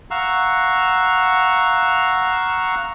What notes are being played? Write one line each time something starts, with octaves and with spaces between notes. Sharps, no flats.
F5 F#5 A#5 C#6 E6